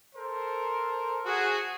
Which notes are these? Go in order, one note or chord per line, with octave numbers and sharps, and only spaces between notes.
A4 A#4 C5
F#4 G#4